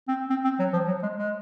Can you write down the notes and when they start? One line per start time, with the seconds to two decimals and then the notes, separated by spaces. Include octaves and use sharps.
0.08 C4
0.30 C4
0.45 C4
0.59 F#3
0.73 F3
0.88 F#3
1.03 G#3
1.17 G#3